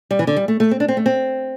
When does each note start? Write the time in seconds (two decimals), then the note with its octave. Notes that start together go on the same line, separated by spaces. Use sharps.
0.11 G3
0.19 E3
0.27 D3
0.36 G3
0.48 A3
0.60 A3
0.71 C4
0.80 D4
0.88 C4
0.97 A3
1.06 C4